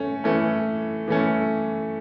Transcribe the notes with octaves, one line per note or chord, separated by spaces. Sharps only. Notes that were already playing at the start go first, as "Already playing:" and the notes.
Already playing: A3 C#4
E3 A3 C#4
E3 A3 C#4